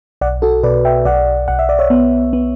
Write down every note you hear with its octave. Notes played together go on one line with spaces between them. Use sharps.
B1 D5 F#5
F#4 A4
B2 B4 D5
E5 G5
B1 D5 F#5
B1 F#5
E5
D5
C#5 E5
B3
B3